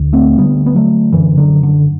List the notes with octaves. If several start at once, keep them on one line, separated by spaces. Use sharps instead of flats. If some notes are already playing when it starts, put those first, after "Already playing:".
Already playing: D2 D3
A3 C4
D2 D3 G3 B3
B3
F#3 A3
F#2 D3 E3
D3 F#3
D3